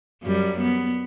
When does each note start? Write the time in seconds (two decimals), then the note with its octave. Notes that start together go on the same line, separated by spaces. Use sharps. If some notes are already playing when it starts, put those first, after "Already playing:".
0.23 F#2 G3
0.61 B3